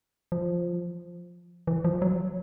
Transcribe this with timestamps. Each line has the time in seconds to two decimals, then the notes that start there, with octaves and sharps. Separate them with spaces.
0.32 F3
1.67 E3
1.85 F3
2.02 F#3